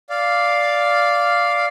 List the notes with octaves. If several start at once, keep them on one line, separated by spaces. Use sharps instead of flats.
D5 F5